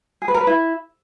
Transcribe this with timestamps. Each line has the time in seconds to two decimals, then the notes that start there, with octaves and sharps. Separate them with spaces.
0.22 G#4
0.28 B4
0.34 A#4
0.41 B4
0.47 E4